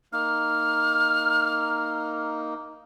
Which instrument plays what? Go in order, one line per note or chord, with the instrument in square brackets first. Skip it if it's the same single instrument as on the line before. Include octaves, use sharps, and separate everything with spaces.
[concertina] A#3 D#4 [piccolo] F6